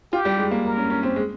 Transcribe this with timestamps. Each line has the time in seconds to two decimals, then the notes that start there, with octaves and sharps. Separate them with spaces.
0.12 F4 G4
0.25 G3
0.39 G#3
0.51 A#3
0.64 A#4
0.77 C#4
0.90 C#4
1.03 C4
1.16 G#3